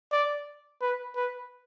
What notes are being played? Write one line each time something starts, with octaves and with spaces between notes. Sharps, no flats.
D5
B4
B4